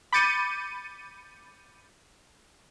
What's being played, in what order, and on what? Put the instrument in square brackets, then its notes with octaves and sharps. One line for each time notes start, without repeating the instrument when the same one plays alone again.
[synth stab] B5 D6 G6 A6 C#7 D#7